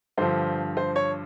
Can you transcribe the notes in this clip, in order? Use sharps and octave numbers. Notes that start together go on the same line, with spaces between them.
G2 D3 F3 C5
C5
C#5